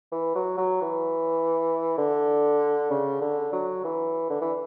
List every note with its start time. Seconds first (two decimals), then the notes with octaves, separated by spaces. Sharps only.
0.12 E3
0.35 F#3
0.58 F#3
0.82 E3
1.98 D3
2.90 C#3
3.21 D3
3.53 F#3
3.84 E3
4.30 D3
4.41 E3